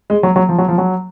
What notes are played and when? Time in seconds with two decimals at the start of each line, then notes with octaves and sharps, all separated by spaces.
0.10 G#3
0.23 F#3
0.36 F#3
0.49 F3
0.58 F#3
0.68 F3
0.78 F#3